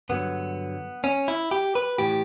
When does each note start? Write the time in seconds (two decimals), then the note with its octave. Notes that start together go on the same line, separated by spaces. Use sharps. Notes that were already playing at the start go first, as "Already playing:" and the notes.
0.09 G2 D3 F#3 B3
1.04 C#4
1.28 E4
1.51 G4
1.75 B4
1.98 A2 E3 G4